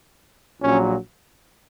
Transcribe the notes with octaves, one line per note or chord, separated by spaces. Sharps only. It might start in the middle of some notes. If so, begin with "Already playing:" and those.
A#1 A#2 F#3 C#4